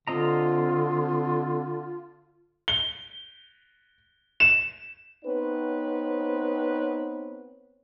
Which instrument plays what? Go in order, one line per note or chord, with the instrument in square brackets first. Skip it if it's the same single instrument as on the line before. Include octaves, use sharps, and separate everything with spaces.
[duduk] D3 [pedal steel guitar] C4 D#5 A#5 [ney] F4
[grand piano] G7
E7
[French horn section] B3 C4 D#4 B4 C#5